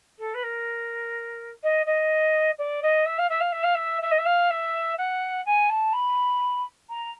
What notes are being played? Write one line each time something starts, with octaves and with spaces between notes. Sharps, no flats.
A4
B4
A#4
D#5
D#5
D5
D#5
E5
F5
E5
F5
E5
F5
E5
E5
D#5
E5
F5
E5
F#5
G#5
A5
B5
A#5